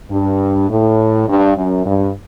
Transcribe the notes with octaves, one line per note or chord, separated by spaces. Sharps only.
G2
A2
G2
F#2
G2